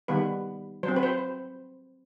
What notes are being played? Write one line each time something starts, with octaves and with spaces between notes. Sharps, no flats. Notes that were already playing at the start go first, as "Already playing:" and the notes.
D#3 G3 B3 B4
F#3 C5
C4
B4
C5